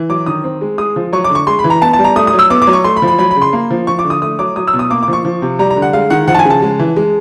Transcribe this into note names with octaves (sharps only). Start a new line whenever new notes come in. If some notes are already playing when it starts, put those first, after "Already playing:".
Already playing: E3
F#3 D6
D#3 D#6
C4
G#3
G#3 D#6
F3
F#3 C#6
D6
D3
C#6
G#3 C6
B5
E3
A#5
B3 A5
A5
G3
A#5
A3 D#6
D#6
F#3
E6
B3 D6
D6
F#3
C#6
A3 C6
B5
F3
B5
F#3 B5
B5
C#3
C6
A#3
F3
F3 C#6
D6
D3
D#6
A3 D#6
F#3 D6
F#3 D#6
E6
B2
D#6
A#3 D6
D6
F3 C#6
F3
C3
G3 A#5
A#5
D3
F#5
G#3 F5
D#3 F#5
F3 F#5
A5
G#5
C#3
A5
G#3
E3
G#3